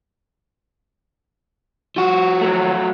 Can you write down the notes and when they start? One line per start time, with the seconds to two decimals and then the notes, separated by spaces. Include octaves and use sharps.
1.97 F3 F#4
2.41 F#3 A3